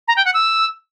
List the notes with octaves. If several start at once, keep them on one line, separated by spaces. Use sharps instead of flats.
A#5
G5
F#5
E6